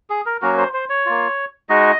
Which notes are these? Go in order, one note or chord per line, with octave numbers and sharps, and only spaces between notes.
G#4
A#4
F#3 A#3 C#4 F#4 A#4
C5
C5
C#5
A#3 F4
G#3 D#4 F#4 D#5